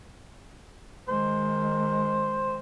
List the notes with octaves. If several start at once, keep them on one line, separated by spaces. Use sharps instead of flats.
D#3 G#3 C5